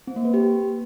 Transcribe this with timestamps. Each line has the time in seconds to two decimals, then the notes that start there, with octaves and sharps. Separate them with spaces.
0.07 C4
0.16 A#3
0.25 B4
0.34 G4